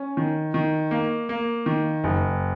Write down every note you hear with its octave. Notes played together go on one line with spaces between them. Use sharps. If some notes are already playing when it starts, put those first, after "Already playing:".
Already playing: C#4
D#3
D#3
A#3
A#3
D#3
F#1